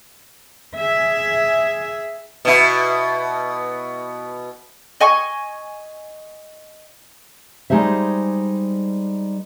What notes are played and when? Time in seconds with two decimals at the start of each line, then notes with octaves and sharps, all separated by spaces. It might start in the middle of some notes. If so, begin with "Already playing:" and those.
0.76 G#4 E5
2.45 B2 E4
5.01 D#5 G#5 C#6
7.70 G3 G#3 D#4 G#4 C5 E5